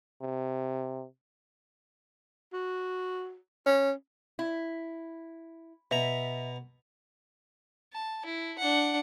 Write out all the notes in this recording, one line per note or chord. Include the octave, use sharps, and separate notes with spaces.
C3
F#4
C#4
E4
B2 E5 A#5
A5
E4
D4 F#5